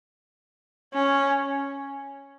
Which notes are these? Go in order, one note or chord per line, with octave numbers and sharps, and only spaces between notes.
C#4